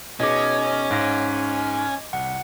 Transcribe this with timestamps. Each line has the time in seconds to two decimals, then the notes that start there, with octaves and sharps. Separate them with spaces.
0.20 B2 C#4 D#4 G#4 D#5 D6
0.90 G#2 F5 A#6
2.13 C2 F#5